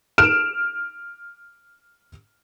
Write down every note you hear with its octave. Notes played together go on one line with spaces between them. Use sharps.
F6 D7 E7